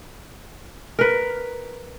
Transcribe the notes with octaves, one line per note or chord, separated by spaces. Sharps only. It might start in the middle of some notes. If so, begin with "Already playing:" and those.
A#4 B4